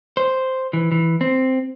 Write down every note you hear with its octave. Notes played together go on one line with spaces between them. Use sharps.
C5
E3
E3
C4